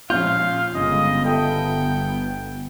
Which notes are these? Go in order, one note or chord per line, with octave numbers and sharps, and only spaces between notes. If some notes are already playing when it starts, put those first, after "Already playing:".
A#1 C#4 F4 F5 G6
G1 C#3 G#3 B3 D#5
A4 E5 G5